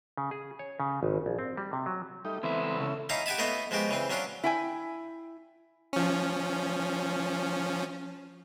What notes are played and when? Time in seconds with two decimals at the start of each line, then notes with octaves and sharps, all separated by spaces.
0.17 C#3
0.31 G#4
0.59 C#5
0.80 C#3
1.03 G#1
1.26 A#1
1.39 C4
1.57 G3
1.73 C3
1.86 F#3
2.25 G3 A3 D#4
2.43 C#2 E3 B3 C4 E5
2.80 C#3 A3 E4
3.09 C#4 D#4 E4 F5 A#5
3.26 G4 F#5 G#5 A5 B5
3.38 A3 B3 E4 F4 C#5 D#5
3.71 F3 G#3 B3 F#4 G4
3.89 C#3 E3 C4
4.10 F#3 C#4 D4 F4
4.44 E4 G5 G#5
5.93 F3 C#4